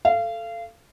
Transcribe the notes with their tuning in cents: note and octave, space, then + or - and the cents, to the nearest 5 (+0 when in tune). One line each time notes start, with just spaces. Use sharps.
A4 +0 F5 -30